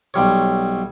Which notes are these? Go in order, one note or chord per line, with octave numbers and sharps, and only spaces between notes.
B1 G3 C#5